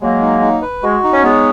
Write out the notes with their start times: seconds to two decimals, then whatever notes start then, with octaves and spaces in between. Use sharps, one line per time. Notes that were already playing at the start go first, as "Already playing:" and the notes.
0.01 F#3 G#3 A#3
0.21 D#4
0.41 D#4
0.62 B4
0.83 G#3 F#4
1.04 D#4
1.13 C#4
1.24 G#3 B3 C#5